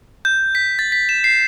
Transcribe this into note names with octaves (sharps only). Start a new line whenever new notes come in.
G6
B6
A6
B6
E7
C7